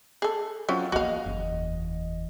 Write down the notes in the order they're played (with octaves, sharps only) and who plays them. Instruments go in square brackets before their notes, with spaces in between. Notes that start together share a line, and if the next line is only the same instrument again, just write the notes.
[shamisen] G#4 A4
[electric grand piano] F#3 F4 F#5 [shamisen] C4 C#4
[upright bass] F3 A#3 [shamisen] F#4 F5 [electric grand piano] D#5
[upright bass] F#1 E2